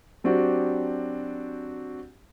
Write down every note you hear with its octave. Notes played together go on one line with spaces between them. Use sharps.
F#3 C4 D4 F#4 G4